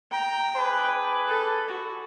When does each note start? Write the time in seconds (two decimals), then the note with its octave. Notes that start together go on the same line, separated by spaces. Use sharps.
0.11 G5 A#5
0.56 D4 G#4 B4
1.27 A4
1.68 F#4